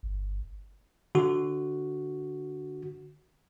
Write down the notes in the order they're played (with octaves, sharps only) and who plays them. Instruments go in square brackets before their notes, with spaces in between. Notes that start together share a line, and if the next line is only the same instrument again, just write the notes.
[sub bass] G1
[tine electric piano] D3 F#4